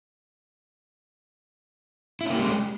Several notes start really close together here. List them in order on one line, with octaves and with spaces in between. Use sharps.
E4 C#4 A#3 G4 G#3